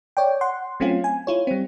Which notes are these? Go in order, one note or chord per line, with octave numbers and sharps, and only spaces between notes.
C#5 D5 G5
F#5 C6
F#3 A3 C4 C#4 F4
G#5
E4 F4 C#5
G3 C4